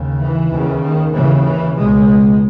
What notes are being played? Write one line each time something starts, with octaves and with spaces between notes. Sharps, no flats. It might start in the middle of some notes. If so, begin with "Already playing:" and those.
Already playing: D#2 C#3
E3
D#2 C#3
D#3
D#2 C#3 E3
E3
C#2 B2 G#3